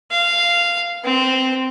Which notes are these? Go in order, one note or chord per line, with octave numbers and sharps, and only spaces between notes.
F5
C4